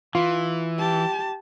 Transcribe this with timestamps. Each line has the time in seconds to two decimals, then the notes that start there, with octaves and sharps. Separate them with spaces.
0.15 E3 F4
0.79 G4 A5